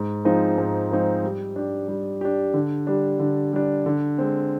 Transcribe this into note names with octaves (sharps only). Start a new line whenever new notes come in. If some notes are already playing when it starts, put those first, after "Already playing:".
Already playing: G#2
F3 G#3 C4 D#4
G#2
F3 G#3 C4 D#4
G3
D4 G4
G3
D4 G4
D3
G3 D4
D3
G3 D4
D3
G#3 C4